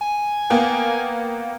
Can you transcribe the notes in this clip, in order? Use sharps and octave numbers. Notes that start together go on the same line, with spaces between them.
G#5
A#3 B3 G5